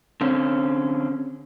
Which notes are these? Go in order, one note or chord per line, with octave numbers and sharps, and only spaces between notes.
D3 C4 C#4